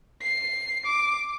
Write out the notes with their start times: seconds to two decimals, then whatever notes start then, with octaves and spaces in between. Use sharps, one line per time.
0.22 C7
0.85 D6